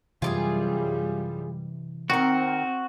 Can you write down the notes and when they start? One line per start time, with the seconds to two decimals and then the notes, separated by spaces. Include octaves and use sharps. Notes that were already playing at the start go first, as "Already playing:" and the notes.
0.22 F#2 C3 E3 G3 F4 G4 G#4
2.10 D#3 C4 F#4 A#4